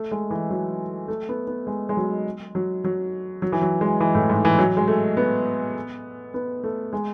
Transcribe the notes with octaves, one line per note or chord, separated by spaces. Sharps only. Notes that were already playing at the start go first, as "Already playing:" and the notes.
Already playing: A3
G#3
E3
F#3
A3
B3
B3
G#3
G#3
F#3
F#3
F#3
F#3
E3
F#3
G#3
E3
A2
G#2
E3
F#3
G#3
A3
B3
B3
A3
G#3